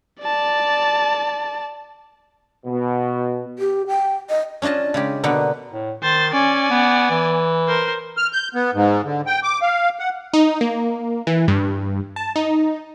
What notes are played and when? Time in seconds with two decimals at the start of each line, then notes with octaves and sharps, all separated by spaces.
0.21 D5 A5
2.66 B2
3.59 G4
3.88 G5
4.30 D#5
4.62 C#4 D4 F4 D#5 A5
4.94 C#3 G#3 G4
5.24 B2 D3 A#3 B3
5.73 A2
6.03 D#3 C5 A6
6.33 C#4 D5 G#5
6.71 B3
7.11 E3
7.67 A#4 C5
8.17 F6
8.33 G6
8.55 B3
8.74 G#2
9.05 D3
9.27 G5
9.43 D6
9.62 F5
9.99 F#5
10.33 D#4
10.61 A#3
11.27 E3
11.48 G2
12.16 A5
12.36 D#4